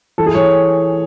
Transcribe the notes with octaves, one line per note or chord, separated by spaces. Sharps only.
E3 A4
G#4
E3 C#5